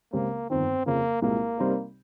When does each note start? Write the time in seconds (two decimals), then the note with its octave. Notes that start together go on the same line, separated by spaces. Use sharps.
0.13 C#2 C#3 G#3 A#3 C4 G4
0.50 G1 F2 D#3 C4
0.86 F2 C#3 F3 A#3
1.22 C2 A#2 G#3 A#3
1.58 C3 G3 C4 D#4 A#4